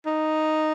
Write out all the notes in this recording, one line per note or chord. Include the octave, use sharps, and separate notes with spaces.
D#4